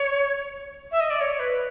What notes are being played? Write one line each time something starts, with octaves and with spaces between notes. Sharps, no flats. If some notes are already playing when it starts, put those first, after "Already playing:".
Already playing: C#5
E5
D#5
D5
C#5
B4